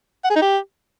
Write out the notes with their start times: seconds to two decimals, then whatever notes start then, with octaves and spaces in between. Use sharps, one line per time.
0.24 F#5
0.30 G#4
0.36 D#4
0.42 G4